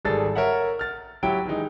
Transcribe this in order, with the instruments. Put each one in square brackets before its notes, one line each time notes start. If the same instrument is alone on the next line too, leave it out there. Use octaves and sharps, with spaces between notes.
[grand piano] G#1 G3 G#4 A4 A6
A#4 C#5 E5 F#5
F6 A6
F#3 E4 G4 G5 D7
D#3 E3 G#3 D#4